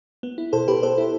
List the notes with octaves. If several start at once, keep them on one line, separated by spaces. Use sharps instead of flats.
B3
E4
B2 A4 C5
B2 G4 B4
B3 A4 C5
E4